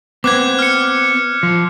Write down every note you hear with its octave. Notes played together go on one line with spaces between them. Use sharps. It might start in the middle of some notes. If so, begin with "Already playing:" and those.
B3 C4 D6 F#6 G#6
F6 C#7
F3